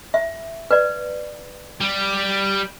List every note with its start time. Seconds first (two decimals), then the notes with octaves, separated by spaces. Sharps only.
0.14 E5
0.71 B4 D5
1.81 G3